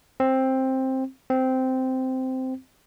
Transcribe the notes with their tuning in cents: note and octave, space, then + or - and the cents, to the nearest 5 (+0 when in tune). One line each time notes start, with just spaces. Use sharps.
C4 +10
C4 -10